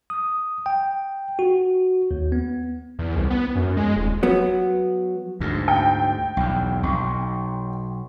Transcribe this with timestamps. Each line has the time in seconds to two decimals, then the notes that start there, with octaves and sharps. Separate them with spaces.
0.10 D#6
0.66 G5
1.39 F#4
2.11 D#2
2.32 B3
2.99 E2
3.15 C2
3.30 B3
3.56 F#2
3.77 G#3
3.96 D#1
4.23 F#3 B3
5.41 D2 G#2
5.68 G5
6.37 B1 E2
6.83 B1